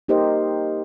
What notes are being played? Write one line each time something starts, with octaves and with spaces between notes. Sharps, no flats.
A#3 D#4 G4 A#4 C5 D#5